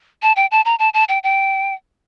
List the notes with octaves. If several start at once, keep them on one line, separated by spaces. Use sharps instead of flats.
A5
G5
A5
A#5
A5
A5
G5
G5